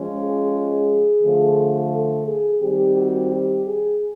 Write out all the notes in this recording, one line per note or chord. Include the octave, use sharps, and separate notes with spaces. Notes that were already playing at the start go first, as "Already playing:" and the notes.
Already playing: F3 G#3 C#4
G#4
G#4
D3 F3 A3
A4
G#4
D#3 G3 C4 G4
F#4
G4
G#4